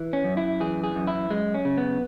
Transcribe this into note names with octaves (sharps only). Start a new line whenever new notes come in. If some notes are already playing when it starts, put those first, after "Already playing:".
Already playing: E3
C#4
F#2
E4
E3 G#4
G#4
F#2
E4
F#2 G#3
C#4
C#3
B3